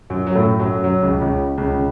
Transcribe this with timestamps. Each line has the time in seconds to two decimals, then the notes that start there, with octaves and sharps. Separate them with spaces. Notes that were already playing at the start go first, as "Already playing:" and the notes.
0.10 F#2 F#3
0.27 F#3
0.35 A2 A3
0.59 F#2 F#3
0.83 F#2 F#3
1.03 C#2 C#3
1.21 C#2 C#3
1.57 C#2 C#3
1.75 C#3